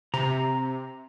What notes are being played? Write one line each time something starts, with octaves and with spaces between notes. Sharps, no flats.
C3 A#5